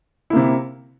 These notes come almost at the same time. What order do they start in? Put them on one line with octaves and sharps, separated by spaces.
E4 A#3 C3